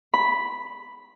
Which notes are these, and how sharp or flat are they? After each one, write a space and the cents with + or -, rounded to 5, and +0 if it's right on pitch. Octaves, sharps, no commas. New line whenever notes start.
B5 +0